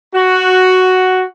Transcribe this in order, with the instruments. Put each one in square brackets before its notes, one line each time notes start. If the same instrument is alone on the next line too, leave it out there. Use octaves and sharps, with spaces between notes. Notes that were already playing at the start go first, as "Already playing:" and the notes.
[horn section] F#4